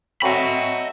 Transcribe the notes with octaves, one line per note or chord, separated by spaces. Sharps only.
F#3 A3 C4 F#4 D#5 E5 B5